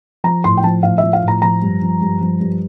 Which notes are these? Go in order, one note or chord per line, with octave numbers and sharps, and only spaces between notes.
F3 A#5
A2 C6
G5
F3 A5
A2 F5
E5
F3
F5
A2
A#5
F3 A#5
G2
F3
G2
F3
G2